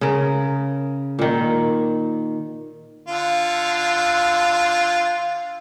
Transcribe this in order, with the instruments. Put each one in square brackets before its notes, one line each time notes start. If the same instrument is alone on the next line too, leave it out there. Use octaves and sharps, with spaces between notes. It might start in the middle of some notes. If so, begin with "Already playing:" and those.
[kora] C#3 A#4
A#2 D#3
[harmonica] D3 F4